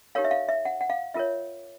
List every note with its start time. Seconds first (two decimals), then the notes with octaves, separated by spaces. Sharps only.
0.15 D#4 G4 A#4 C#5 F5
0.25 E5
0.31 F5
0.49 E5
0.65 F#5
0.81 F#5
0.90 F5
1.14 F4 A#4 C#5 E5